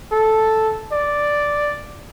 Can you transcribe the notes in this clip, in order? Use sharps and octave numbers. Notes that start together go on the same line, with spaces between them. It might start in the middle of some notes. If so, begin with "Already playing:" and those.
A4
D5